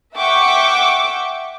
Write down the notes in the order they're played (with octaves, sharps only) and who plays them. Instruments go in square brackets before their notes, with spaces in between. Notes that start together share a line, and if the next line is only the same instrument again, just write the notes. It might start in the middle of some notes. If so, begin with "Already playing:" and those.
[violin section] E5 F#5 G5 C#6 D6